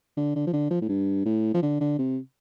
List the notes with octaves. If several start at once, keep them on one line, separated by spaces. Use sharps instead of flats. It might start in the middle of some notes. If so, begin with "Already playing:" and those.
D3
D3
F3
D3
F3
A2
G2
A2
F3
D3
D3
C3